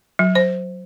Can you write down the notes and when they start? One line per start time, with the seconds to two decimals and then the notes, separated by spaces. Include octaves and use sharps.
0.19 F#3
0.35 C5